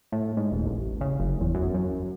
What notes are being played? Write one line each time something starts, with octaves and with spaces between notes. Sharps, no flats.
A2
G#2
D#1
A1
C#3
F#1
E2
F#2
F#2